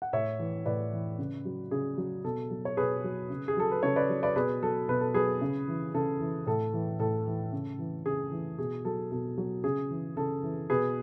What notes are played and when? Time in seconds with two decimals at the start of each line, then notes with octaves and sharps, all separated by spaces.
0.02 F#5
0.13 A2 C#5 E5
0.39 E3
0.66 A2 B4 D5
0.93 E3
1.19 C#3
1.45 F#3
1.71 C#3 G#4
1.98 F#3
2.24 B2 A4
2.50 F#3
2.65 C#5
2.77 B2 G#4 B4
3.04 F#3
3.30 C#3
3.48 G#4
3.57 F#3 A4
3.71 B4
3.83 C#3 A4 C#5
3.96 B4 D5
4.09 F#3
4.23 B4 D5
4.36 B2 G#4 B4
4.62 F#3 A4
4.89 B2 B4
5.01 A4
5.14 F#3 G#4 B4
5.41 C#3
5.68 E3
5.94 C#3 A4
6.21 E3
6.47 A2 A4
6.73 E3
6.99 A2 A4
7.26 E3
7.52 C#3
7.79 E3
8.06 C#3 G#4
8.32 E3
8.58 B2 G#4
8.85 F#3 A4
9.12 B2 A4
9.38 F#3
9.64 C#3 G#4
9.90 E3
10.17 C#3 A4
10.43 E3
10.70 B2 G#4 B4